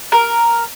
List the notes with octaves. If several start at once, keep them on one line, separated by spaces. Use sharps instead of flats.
A#4